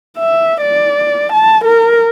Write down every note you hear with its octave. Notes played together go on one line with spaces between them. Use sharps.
E5
D5
A5
A#4